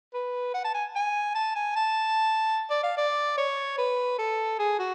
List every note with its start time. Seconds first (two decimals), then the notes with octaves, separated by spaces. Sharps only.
0.14 B4
0.54 F#5
0.64 A5
0.74 G#5
0.95 G#5
1.35 A5
1.56 G#5
1.76 A5
2.70 D5
2.83 F5
2.97 D5
3.38 C#5
3.78 B4
4.18 A4
4.59 G#4
4.79 F#4